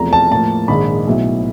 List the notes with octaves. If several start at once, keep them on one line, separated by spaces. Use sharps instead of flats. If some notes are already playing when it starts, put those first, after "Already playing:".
Already playing: E2 C3 F3 A3 A#5
A5
A2 F3 A#3 A5
A#1 G#2 D#3 G#3 B5
B1 A2 F#3 B3 E4